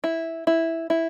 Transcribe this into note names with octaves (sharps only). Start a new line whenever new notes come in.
E4
E4
E4